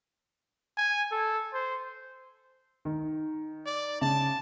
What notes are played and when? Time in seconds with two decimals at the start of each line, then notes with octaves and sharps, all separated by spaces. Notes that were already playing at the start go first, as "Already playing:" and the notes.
0.77 G#5
1.11 A4
1.53 C5
2.85 D#3
3.66 D5
4.01 C#3 A5